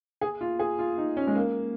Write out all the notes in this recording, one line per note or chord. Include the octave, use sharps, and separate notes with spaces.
G#4
F4
G#4
F4
D#4
C#4
G#3
A#3